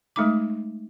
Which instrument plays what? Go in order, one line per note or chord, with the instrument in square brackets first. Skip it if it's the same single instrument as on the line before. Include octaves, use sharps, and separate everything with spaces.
[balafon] G#3 A3 D#4 D6